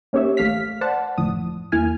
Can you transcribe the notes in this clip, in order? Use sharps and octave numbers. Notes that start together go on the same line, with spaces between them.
A#3 C#4 D#4 G4 C#5 E5
A1 A3 F5 F6 B6
C5 D5 F#5 A5
G1 F2 A2 F3 D#6
E2 A#3 E4 G#5 F6